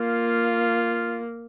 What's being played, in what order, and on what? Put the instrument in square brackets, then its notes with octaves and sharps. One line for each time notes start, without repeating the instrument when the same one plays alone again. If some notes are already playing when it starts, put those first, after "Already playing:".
Already playing: [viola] A#3 [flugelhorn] F4